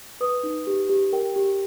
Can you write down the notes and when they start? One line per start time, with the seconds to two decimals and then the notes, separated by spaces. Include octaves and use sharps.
0.21 B4 D#6
0.43 D#4
0.67 G4
0.90 G4
1.13 A#4 G5
1.36 G4